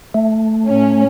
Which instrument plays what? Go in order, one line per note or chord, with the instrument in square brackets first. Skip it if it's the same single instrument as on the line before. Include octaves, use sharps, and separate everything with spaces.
[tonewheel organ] A3
[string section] A2 C#4